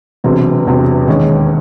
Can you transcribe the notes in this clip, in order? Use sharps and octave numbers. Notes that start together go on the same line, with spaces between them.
E1 E2 C3 F#3 C4
E1 E2 C3 F#3 C4
E1 D#2 D#3 G#3 C#4